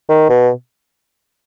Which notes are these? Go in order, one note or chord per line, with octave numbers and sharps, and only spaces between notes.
D#3
B2